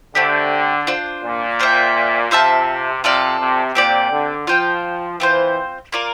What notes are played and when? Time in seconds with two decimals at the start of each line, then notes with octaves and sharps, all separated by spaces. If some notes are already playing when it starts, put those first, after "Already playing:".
0.15 D3 A3 C4 G4
0.87 D4 F4 C5
1.23 A#2
1.59 F4 C5 E5 G5
2.31 C3 F4 C5 E5 A5
3.03 C3 F4 A4 D5 F5
3.40 C3
3.75 A#2 C4 G4 D5
4.11 D3
4.47 F3 F4 C5 G5
5.20 E3 C4 F4 C5
5.92 A#3 F4 A#4 D5